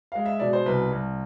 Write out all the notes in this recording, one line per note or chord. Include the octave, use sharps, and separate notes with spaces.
G#3 F5
E5
B2 D5
C5
C2 B4
C2